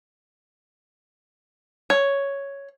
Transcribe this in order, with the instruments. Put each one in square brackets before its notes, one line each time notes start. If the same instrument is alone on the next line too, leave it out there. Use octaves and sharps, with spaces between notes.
[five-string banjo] C#5